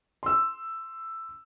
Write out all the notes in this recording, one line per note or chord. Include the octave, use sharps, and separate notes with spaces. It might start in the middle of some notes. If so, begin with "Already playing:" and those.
C6 E6